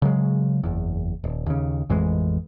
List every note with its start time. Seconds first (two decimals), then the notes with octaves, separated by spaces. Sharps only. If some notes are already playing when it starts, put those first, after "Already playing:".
0.02 C#3 F#3 G#3
0.63 F#1 E2
1.24 D#1
1.46 D#2 C#3
1.90 A1 F2 E3 G#3